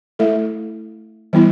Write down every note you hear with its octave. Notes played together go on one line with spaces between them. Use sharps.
A3 E4 A4 E5
E3 G3 B3 E4